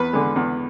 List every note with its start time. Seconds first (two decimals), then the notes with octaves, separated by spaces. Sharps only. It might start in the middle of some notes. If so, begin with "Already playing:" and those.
Already playing: E2 B4
0.13 D3 G#3
0.36 E2